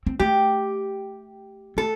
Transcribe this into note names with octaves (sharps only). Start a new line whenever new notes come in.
C4
A3 G4
A3 A4